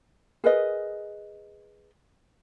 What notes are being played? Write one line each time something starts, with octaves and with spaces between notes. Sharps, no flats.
G#4 A#4 B4 D#5